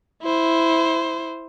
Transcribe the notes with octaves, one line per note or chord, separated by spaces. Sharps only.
E4 C5